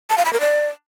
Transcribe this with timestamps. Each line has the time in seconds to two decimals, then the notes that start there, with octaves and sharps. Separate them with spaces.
0.10 A5
0.18 F5
0.25 B5
0.33 A#4
0.41 D5